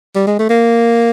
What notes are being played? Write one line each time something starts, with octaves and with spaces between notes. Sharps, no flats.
G3
G#3
A3
A#3